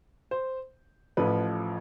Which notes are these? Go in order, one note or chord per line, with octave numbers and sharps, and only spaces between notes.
C5
A1 A2 F3 B4